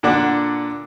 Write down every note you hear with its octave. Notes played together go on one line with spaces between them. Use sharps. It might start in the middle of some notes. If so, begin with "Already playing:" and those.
A#2 D3 D4 F#5 D6